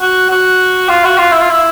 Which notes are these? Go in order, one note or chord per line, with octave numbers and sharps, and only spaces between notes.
F#4
F#4
F4
F#4
F4
E4
F4
E4